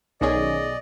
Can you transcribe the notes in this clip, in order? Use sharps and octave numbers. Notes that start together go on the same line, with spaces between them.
B1 D#3 C#4 G#4 D5 D#5